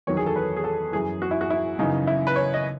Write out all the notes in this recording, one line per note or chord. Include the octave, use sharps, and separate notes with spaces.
E2 D#3 F#3 C#5
G#4
A4
B4
G#4
A4
F#2 E3 G#4
F#4
E4
F#4
E4
F#2 C#3 E3 D#4
E4
B4
C#5
D#5